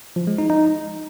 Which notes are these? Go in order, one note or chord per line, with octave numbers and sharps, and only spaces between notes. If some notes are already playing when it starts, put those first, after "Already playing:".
F3
G#3
D#4
D#4